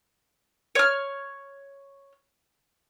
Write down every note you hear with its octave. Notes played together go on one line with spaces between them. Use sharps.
C#5 F6